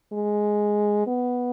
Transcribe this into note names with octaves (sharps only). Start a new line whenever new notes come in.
G#3
B3